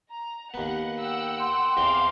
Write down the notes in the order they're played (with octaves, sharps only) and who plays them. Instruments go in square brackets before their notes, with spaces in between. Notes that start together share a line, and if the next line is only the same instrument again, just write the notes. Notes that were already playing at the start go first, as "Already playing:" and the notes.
[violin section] A#5
[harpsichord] D#2 B3 [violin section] F#5
[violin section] F#5 G5 E6
[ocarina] C6
[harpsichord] E2 C4 G5 [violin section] F5 D6